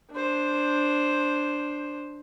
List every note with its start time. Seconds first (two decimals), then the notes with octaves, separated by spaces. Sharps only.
0.12 D4 C5